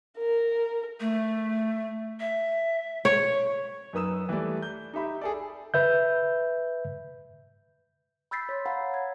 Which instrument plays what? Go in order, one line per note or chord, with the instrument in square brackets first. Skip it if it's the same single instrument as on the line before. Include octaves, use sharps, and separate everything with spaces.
[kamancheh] A#4
[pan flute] A3
E5
[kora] C#5
[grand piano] F#2 D#4 B4 D#6 E6 E7
E3 G3 A3 D5
G6
D#4 G4 E5 B5
G#4 A4 D5
[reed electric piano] B4 E5 G6
[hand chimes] B5 E6 G6 A6 B6 C7
C#5 C6
C#5 F5 F#5 A#5 B5
G#6